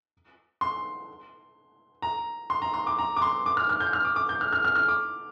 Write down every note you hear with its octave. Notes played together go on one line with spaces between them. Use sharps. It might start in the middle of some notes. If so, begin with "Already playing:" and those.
C6
A#5
C6
A#5
C6
D6
A#5
D6
C6
D6
F6
F6
G6
F6
D6
D6
G6
F6
F6
F6
F6
D6